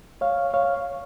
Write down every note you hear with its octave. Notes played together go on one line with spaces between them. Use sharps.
C#5 F5
C#5 F5